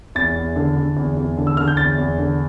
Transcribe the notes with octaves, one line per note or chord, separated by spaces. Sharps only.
E2 A6
E2
D3
D3
E2
E2
D3
E6
D3 F6
G6
E2 A6
E2
D3